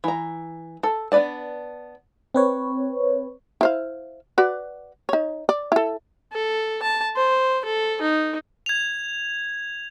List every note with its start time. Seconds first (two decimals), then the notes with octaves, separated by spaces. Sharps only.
0.04 E3 A#5
0.83 A4
1.12 B3 D4 B4 D5 A5
2.34 C4 B4 C#5
3.61 E4 C5 F5
4.38 F#4 B4 D5
5.09 D#4 C#5
5.49 D5
5.72 E4 A4
6.33 A4
6.82 A5
7.16 C5
7.65 A4
8.01 D#4
8.66 G#6 F7